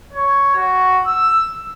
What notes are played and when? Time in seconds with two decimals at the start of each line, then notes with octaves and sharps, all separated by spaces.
0.13 C#5
0.55 F#4
1.06 E6